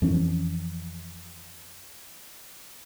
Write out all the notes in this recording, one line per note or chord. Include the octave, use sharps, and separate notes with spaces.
F2 E3 C#4